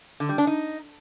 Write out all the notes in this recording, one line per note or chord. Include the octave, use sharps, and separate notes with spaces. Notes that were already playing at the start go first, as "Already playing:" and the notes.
D3
G3
D4
D#4